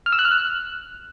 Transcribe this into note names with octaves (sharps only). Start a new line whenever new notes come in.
F6
E6
F#6
F6
F#6